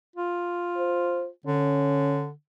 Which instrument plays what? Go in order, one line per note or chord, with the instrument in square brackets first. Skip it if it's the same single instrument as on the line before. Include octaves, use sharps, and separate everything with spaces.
[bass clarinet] F4
[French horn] C5
[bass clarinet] D3 [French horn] C#4